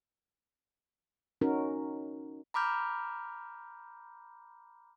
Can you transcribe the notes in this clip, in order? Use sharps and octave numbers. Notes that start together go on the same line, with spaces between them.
C#4 D#4 F#4 A#4
A#5 B5 D6 F6 G6